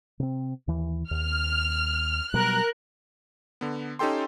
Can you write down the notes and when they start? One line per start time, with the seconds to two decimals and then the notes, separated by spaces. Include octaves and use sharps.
0.20 C3 C4
0.68 D#2 E3
1.11 D#2 F6
2.34 B2 F#3 G3 A#4 F#6
3.61 D3 B3
3.99 C#4 D#4 G4 A4 G5 C6